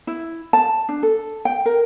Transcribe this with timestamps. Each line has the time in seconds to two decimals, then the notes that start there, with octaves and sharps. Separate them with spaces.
0.07 E4
0.53 A5
0.89 D4
1.03 A4
1.45 G5
1.66 A#4